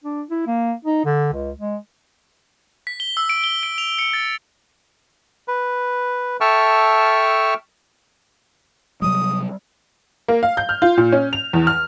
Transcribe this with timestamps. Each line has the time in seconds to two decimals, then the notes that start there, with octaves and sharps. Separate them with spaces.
0.04 D4
0.30 E4
0.47 A#3
0.85 D#4
1.05 D3
1.33 C#2
1.60 G#3
2.87 B6
3.00 G7
3.17 E6
3.30 D7
3.44 G7
3.63 D7
3.78 F7
3.99 C#7
4.13 A6
5.48 B4
6.41 A4 E5 G5 A5 C#6 F6
9.02 C3 F#3 G3 D#6
10.28 A#3
10.43 F5
10.57 G6
10.69 F6
10.82 F4
10.97 A#2
11.12 C#4
11.33 F7
11.53 E2
11.67 F6